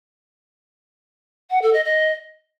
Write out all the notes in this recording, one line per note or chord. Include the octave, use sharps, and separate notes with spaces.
F#5
A4
D#5
D#5